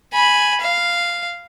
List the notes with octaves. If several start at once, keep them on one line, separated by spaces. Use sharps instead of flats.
G#5 B5
F5